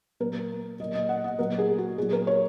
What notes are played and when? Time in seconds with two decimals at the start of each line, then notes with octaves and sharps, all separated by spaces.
0.20 A#2 F#3 A#4
0.80 A#2 F#3 D#5
0.94 D#5
1.09 F#5
1.24 D#5
1.38 A#2 F#3 A#4
1.59 G#4
1.78 F#4
1.98 A#2 F#3 G#4
2.13 A#4
2.27 C#5